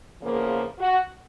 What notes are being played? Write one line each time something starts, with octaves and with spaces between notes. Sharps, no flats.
E2 C#3 F3 A#3
F#4